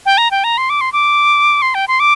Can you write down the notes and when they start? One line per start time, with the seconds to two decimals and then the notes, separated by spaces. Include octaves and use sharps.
0.06 G5
0.18 A#5
0.31 G5
0.44 A#5
0.58 C6
0.70 D6
0.81 C6
0.93 D6
1.62 C6
1.75 G5
1.88 C6
2.00 D6